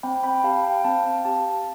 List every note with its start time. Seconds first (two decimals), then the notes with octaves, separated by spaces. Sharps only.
0.03 C4 G5 B5
0.23 G5 B5
0.44 G4 F5 A5
0.64 G5 B5
0.84 C4 F5 A5
1.25 G4 F5 A5